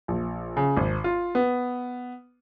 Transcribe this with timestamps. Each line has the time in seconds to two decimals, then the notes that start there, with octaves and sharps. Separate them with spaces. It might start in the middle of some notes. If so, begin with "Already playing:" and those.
0.08 A#1
0.57 C#3
0.77 G#1
1.04 F4
1.35 B3